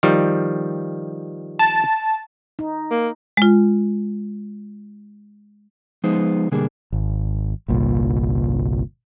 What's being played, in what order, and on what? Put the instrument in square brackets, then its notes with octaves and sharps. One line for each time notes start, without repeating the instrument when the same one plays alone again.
[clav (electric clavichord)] D#3 F3 G3
[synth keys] A5
[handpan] D#4
[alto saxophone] A#3
[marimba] G#3 F4
[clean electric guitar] F3 G#3 B3 D#4 C5
B2 D3 G3 A#3 D4 G#4
[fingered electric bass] G#1
G1 C2 A#2